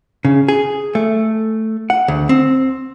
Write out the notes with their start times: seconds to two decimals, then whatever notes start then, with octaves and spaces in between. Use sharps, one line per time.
0.25 C#3
0.48 G#4
0.95 A3
1.90 F#5
2.08 D2
2.29 C4